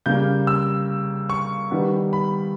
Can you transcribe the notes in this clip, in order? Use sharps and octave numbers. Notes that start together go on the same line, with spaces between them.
C#3 G3 A#3 G6
E6
C#6
D#3 G3 B3
B5